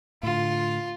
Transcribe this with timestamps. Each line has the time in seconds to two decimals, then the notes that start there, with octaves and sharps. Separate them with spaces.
0.23 A2 D3 F4